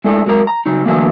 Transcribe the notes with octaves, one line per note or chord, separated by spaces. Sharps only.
G#3 A3 D4 E4 A4
F#3 G#3 A#4 A#5
A#5
C#3 F#3 D#4
D3 E3 F#3 A3 A#3